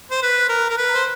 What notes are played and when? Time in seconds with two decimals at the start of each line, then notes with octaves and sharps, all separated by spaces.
0.11 C5
0.23 B4
0.49 A#4
0.70 A#4
0.78 B4
0.94 C5